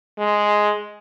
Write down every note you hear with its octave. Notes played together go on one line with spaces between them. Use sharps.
G#3